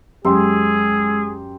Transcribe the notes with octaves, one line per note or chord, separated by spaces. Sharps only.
F#2 G#3 G4 G#4 C6 E6